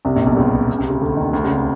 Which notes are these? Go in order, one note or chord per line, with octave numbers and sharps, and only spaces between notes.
C2 C3
A#1 A#2
B1 B2
C#2 C#3
C3
C#3
D2 D3
D#2 D#3
D2 D3
C#2 C#3
C3